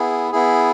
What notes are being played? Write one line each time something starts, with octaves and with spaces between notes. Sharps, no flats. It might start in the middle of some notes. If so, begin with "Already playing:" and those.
Already playing: B3 E4 G#4
B3 E4 G#4